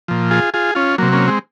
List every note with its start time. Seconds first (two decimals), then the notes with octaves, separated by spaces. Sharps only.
0.08 A#2 F3
0.31 F4 G#4
0.54 F4 G#4
0.75 C#4 F4
0.98 C3 F#3 A#3
1.12 A#3 C#4
1.28 G#3 C4